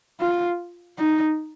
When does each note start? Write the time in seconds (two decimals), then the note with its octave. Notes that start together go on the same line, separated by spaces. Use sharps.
0.21 F4
0.99 D#4